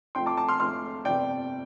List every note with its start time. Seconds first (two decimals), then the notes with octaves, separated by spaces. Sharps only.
0.15 F2 F3 A3 G5 C6
0.26 A5 D6
0.37 A5 D6
0.49 C6 F6
0.60 F2 F3 A3 C6 F6
1.05 G1 F2 C3 D5 G5